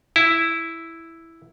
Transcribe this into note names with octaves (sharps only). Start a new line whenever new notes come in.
E4